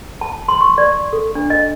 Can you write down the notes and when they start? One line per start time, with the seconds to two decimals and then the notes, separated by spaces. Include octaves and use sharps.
0.21 A5
0.48 C6
0.61 C#6
0.78 D5
1.13 A4
1.35 D4
1.50 D#5